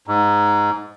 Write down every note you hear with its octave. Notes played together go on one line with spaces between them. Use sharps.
G#2